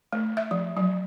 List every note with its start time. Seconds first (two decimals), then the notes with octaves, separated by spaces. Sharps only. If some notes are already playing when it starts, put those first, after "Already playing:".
0.13 A3
0.37 E5
0.51 F3
0.77 F#3